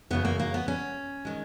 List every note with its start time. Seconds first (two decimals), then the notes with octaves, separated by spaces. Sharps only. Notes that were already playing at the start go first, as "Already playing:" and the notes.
0.11 F#2 C#3 F#3 B3
0.25 A#3
0.40 A#3
0.54 B3
0.68 C#4
1.25 D#3 G#3